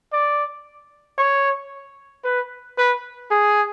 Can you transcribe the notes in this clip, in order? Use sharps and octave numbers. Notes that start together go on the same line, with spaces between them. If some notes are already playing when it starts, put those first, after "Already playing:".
D5
C#5
B4
B4
G#4